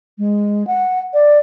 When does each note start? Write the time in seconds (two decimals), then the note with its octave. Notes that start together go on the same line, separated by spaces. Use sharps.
0.19 G#3
0.67 F#5
1.14 D5